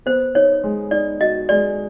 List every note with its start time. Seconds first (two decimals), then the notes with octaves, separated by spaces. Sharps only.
0.06 B3 C5
0.35 D#4 C#5
0.64 G#3
0.91 D#4 D5
1.20 F#4 D#5
1.49 G#3 D5